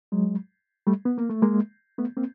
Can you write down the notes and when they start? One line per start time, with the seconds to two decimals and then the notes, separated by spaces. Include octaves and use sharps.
0.12 F#3 G#3
0.87 G3 A3
1.05 B3
1.18 A#3
1.30 A3
1.42 G#3 A#3
1.98 A3 B3
2.17 A#3 C4